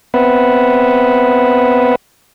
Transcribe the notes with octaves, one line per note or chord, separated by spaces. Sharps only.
B3 C4 B4 E5 F#5